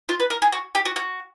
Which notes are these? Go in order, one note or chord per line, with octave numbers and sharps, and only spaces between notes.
F4
B4
A#4
G#4
F#4
G4
F#4
F#4